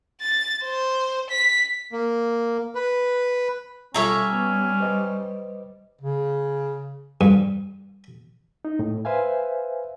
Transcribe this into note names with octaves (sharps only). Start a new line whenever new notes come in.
A6
C5
B6
A#3
B4
B2 G3 C#4 F4 A4 C#5 E5 A#5
B3
B4 C5 D#5
C#3
G2
D#4
A2
B4 C5 E5 F5 G#5